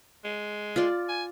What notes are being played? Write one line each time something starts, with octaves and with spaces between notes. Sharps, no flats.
G#3
F4 D5
G#5